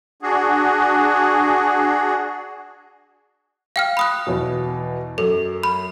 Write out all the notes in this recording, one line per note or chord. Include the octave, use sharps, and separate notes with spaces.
D4 F#4 G#4
F5 G5 F6
B5 D#6 F#6
E2 B2
F#2 A4
B5